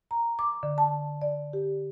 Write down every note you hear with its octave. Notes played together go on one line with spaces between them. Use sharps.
A#5
D6
D3
A5
D5
G4